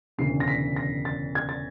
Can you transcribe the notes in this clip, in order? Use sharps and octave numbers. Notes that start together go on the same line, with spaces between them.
E1 D2 C#3 E3 C7
A#6
B6
A#6
A6
G#6
A6